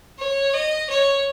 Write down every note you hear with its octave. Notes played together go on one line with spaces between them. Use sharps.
C#5
D#5
C#5